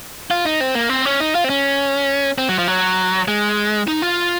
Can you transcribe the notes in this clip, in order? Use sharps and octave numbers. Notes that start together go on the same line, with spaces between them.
F4
D#4
C4
A#3
C4
C#4
D#4
F4
C4
C#4
C4
F#3
F3
F#3
G#3
D#4
F4